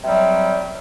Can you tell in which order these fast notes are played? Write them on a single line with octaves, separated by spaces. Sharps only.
C3 G3 F#3